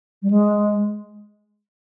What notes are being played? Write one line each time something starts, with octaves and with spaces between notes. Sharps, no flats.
G3
G#3